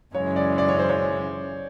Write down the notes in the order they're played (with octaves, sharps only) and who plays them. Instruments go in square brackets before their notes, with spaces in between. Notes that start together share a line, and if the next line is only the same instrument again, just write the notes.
[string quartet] F#2 C#3 E3 G#3 C#4 [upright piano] C#5
[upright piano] D5
D5
C#5
C5
C#5